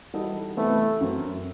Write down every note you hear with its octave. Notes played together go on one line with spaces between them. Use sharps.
E3 G3 D#4 F#4 A4
C3 E3 A3 B3
F#2 F#3 C4